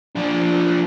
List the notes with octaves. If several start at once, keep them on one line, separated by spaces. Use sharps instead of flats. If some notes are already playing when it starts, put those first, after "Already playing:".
F3 D4